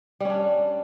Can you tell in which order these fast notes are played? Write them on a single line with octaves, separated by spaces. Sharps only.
G3 C#4 D4